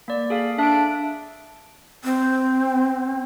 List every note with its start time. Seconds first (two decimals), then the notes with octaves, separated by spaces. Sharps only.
0.08 A#3 D5
0.30 G#4 A4 F5
0.58 D4 E5 D7
2.05 C4